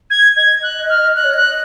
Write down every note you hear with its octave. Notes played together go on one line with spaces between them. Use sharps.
G#6
D#5 G#6
F#6
F6
D#5 F#6
C#5
D#5 F#6